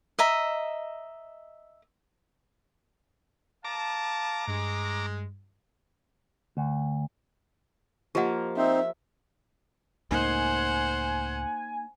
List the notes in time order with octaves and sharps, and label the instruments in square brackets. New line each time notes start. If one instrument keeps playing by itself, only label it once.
[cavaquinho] D#5 E5 A#5
[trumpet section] F5 A5 [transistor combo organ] A#5 D6
[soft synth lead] G2 [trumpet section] G#3
[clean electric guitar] D2
[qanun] F3 A#3 [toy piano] G4 D#5 F#5
[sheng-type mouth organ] C4 D#4 C5 [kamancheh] E5
[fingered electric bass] C#2 A2 [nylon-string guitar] A#3 D#4 [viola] C5 F#5 [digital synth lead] G#5